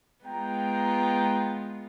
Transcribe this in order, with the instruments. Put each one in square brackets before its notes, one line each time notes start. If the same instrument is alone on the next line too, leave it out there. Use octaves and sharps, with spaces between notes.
[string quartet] G#3 B3 F4 [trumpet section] G5 A#5